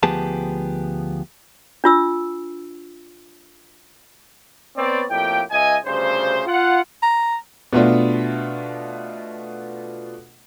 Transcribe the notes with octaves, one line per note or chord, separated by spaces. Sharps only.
D2 F3 B3 G4 G#4 A5
D4 F4 E6
B3 C4 C#5 D5
F2 A2 A#3 G4 G5
C#2 D#5 E5 G#5
D2 G2 C#3 C5
F4 F#5
A#5
B2 A3 B3 D4 F4